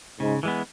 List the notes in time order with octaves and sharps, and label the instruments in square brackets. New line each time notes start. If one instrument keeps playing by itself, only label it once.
[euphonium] G#2 [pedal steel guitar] C#3
[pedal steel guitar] E3 G#3 B3